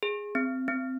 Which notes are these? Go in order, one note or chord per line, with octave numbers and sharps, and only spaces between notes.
G#4
C4
C4